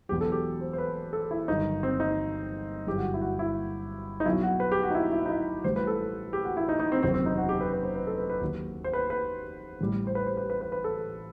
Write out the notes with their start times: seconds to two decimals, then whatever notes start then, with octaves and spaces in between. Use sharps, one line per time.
0.09 E1 E2 B2 F#3 G4
0.21 A4
0.32 G4
0.61 C5
0.73 C5
0.78 B4
1.13 A4
1.31 E4
1.48 G1 G2 D#3 F#3 D#4
1.83 C4
2.00 D#4
2.87 G1 F#2 E3 G4
2.98 F#4
3.14 E4
3.21 F#4
3.39 E4
4.20 D#4
4.25 B1 B2 F#3 E4
4.43 F#4
4.60 B4
4.72 G4
4.83 F#4
4.90 D#4
4.95 E4
5.12 E4
5.25 D#4
5.29 E4
5.64 A1 A2 E3 G3 C5
5.76 B4
5.87 A4
6.33 G4
6.45 F#4
6.57 E4
6.69 D#4
6.80 D#4
6.92 C4
7.03 F#1 E2 C3 D#3 F#3 C4
7.14 C4
7.26 D#4
7.38 F#4
7.49 G4
7.61 B4
7.73 B4
7.83 C5
7.95 B4
8.07 A4
8.18 B4
8.30 B4
8.41 D#2 D#3 F#3
8.84 C5
8.93 B4
9.10 B4
9.81 A1 A2 G3
10.07 C5
10.15 B4
10.27 C5
10.37 B4
10.50 B4
10.61 B4
10.72 B4
10.84 A4